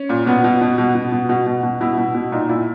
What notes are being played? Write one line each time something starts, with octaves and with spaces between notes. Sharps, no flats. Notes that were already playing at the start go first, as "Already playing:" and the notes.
Already playing: C#4
A#2
B2 B3
B2
B2
B2
B2
B2
B2 F#4
B2
B2
B2 E4
B2
B2
A#2 D#4
A#2 E4